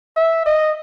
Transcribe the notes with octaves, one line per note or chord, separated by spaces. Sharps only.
E5
D#5